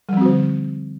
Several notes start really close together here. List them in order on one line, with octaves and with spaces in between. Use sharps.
G3 F3 C4 F#4 D3